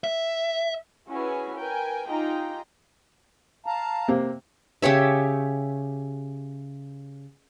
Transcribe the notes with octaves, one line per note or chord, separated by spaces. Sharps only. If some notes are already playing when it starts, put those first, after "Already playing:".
E5
C#4 E4 F#4 G#4 B4 G#5
A#4 B4 G5 G#5
D#4 F4 G4 G#4 G5 A#5
F5 A5 A#5
C3 A#3 C4
C#3 G4 C#5 E5